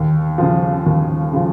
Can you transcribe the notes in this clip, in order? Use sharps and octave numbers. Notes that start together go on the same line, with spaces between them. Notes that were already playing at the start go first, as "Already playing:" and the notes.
Already playing: D#2
C#3 F3
D#2
C#3 F3